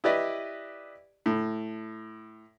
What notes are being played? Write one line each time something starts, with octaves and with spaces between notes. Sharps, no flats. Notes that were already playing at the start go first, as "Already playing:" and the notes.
E4 G4 B4 D5 D#5
A2